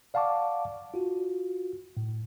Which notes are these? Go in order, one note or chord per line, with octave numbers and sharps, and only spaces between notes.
D5 F5 F#5 A5 C#6 D6
F4 F#4
A2